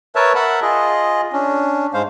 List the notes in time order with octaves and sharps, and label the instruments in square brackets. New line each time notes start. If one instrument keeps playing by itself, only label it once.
[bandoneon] A#4 B4 C#5 E5 A5
A#4 E5 F#5 A5 B5
F4 G#4 D#5
C#4 D4
G#2 G#3 C5 F5